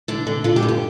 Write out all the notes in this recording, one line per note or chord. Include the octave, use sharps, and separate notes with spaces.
D3 D4
D3
D3 F4
G4
G2
G4